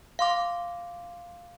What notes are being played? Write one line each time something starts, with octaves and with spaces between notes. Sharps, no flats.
F5 C6 D6